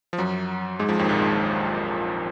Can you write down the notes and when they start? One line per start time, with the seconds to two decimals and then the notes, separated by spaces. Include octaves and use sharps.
0.13 F3
0.18 F#2 F#3
0.79 G#2 G#3
0.89 F2 F3
0.99 D#2 D#3
1.09 A#1 A#2
1.19 G#2